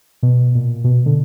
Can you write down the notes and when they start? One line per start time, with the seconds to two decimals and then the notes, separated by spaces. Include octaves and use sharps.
0.23 B2
0.55 A#2
0.84 B2
1.06 D3